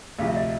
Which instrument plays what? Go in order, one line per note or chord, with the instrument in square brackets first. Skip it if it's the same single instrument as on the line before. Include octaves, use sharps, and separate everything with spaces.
[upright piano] D2 C3 F3 [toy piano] F5
[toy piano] E5
D#5